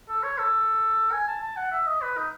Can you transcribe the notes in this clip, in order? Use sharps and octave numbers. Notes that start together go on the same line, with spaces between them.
A4
C#5
A4
G#5
A5
A5
F#5
E5
D#5
B4
D#4